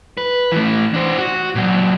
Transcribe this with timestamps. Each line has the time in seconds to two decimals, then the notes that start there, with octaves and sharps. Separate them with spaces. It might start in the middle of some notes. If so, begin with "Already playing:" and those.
0.17 B4
0.52 E3 A3
0.94 D4 C5
1.18 F#4
1.55 A#2 F#3